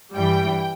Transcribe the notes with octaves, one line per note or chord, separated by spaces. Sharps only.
G2 E3 G3 G5